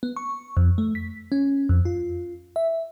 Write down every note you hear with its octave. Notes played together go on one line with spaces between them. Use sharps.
B3
C#6
F2
A3
B6
C#4
F2
F4
E5